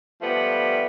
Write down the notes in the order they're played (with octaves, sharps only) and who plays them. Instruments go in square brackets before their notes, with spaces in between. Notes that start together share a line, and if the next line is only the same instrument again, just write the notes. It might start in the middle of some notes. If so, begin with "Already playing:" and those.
[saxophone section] F3 G3 A3 B3